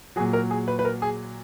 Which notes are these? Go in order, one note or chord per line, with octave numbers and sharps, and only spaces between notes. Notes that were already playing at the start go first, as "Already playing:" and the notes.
A#2 F#3 G#4
A#4
G#4
B4
B4
A#4
G#4